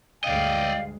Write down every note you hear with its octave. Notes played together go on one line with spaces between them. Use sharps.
D2 G2 G#3 D5 D#5 F5 G5